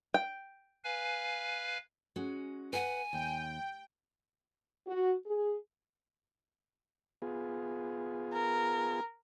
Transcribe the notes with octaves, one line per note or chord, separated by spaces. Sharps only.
G5
B4 F5 G#5
G#3 C#4 F#4
B4 F#5 G#5
D#2 G5
F#4
G#4
B3 F4 G#4
A#4